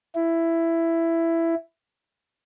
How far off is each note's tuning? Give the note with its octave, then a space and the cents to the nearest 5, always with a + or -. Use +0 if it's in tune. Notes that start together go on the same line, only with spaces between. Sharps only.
E4 +10